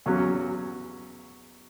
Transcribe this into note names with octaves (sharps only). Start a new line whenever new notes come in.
E2 C#3 F#3 C#4 F#4